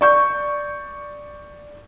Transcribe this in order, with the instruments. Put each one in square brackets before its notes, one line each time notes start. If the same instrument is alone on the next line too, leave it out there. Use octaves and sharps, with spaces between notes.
[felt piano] D5 C#6 G6